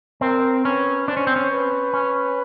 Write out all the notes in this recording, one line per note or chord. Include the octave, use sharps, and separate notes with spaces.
C4 A#4
C#4 B4
D4 C5
C#4
C4
C#4
B4
C#4